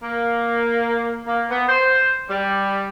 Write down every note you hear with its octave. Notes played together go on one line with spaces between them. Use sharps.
A#3
A#3
B3
C5
G3